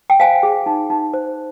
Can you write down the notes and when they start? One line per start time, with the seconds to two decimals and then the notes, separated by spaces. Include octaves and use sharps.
0.10 G5
0.20 C5 F5 G#5
0.43 G#4
0.66 D#4
0.90 D#4
1.14 C5